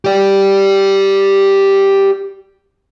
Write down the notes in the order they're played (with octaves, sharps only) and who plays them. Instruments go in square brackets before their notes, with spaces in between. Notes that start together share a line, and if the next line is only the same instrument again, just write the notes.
[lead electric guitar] G4 D5